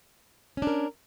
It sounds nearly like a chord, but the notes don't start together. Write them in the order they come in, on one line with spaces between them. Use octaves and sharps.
C#4 D4 A#4